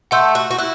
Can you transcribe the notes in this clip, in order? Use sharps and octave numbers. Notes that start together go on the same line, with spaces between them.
A3 F#5 C6 E6 G6
F#4
F#4
E4 F#6